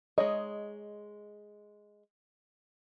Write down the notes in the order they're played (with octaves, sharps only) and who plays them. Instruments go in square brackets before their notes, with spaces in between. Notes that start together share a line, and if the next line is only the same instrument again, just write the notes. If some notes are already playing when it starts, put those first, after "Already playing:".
[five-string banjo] G#3 C#5 [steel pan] D#5